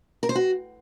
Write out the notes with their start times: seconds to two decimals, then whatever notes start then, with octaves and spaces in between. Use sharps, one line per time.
0.23 A#4
0.29 C5
0.35 F#4